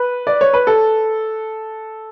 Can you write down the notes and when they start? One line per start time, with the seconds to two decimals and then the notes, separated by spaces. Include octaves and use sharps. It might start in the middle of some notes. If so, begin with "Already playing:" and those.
Already playing: B4
0.27 D5
0.41 C#5
0.54 B4
0.67 A4